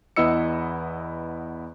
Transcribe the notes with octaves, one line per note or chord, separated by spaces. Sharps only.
E2 B3 E4 D#5 E6 C#7